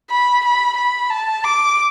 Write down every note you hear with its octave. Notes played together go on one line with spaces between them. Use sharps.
B5
B5
B5
A5
D6